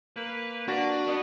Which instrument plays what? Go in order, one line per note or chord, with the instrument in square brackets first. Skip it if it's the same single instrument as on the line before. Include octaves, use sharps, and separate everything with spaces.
[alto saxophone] A#3 [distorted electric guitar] B4
[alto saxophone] A#3 [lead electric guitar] D4 [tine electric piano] F#4 A6 A#6
[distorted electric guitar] B3 F#5 [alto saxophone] D#5